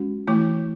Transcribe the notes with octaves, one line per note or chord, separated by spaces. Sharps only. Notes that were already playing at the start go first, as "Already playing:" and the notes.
Already playing: G#3 C#4 F#4
E3 A3 E4